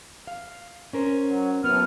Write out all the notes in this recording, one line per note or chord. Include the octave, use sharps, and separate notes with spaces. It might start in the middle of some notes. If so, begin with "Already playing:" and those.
F5
C#4 A#4 C5
F#3
A2 F#3 B3 F6